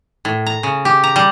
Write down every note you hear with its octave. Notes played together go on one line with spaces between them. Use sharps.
A2
A#5
C#3
G4
A#5
G3